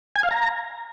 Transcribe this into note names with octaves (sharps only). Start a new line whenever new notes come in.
G#5
F5
A#5